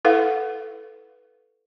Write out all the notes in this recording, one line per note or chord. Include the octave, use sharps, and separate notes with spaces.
E4 A4 B4 F5 F#5